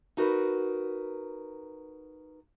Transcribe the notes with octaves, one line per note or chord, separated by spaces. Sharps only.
D#4 F#4 A#4 B4